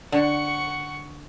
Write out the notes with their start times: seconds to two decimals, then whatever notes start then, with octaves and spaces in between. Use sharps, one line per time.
0.12 D3 F#5 C#6